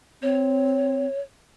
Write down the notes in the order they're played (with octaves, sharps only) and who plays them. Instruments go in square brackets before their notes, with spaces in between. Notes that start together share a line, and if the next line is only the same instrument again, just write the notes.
[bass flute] C4 [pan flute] C#5